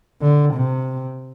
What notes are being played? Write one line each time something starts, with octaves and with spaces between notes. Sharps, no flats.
D3
C3